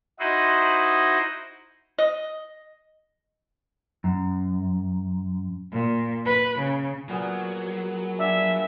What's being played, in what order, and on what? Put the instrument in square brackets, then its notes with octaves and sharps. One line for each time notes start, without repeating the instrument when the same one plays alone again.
[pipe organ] D#4 E4 F#4 C5 D#5
[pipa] D#5
[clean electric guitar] F#2
[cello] A#2
B4
C#3
[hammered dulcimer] A#2 B3 G#4 [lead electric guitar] F#3
[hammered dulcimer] D4 F5 G#5 [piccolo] E5